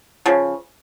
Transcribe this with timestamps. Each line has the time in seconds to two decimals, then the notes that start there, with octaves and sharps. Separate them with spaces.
0.26 C#3 F3